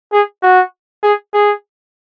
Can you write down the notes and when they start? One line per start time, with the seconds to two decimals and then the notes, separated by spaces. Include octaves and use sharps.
0.12 G#4
0.43 F#4
1.03 G#4
1.34 G#4